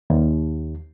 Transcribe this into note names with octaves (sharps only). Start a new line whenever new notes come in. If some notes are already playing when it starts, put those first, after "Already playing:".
D#2